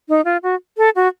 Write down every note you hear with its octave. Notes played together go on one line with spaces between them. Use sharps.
D#4
F4
F#4
A4
F#4